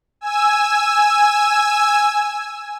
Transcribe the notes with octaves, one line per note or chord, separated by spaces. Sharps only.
G#5 E6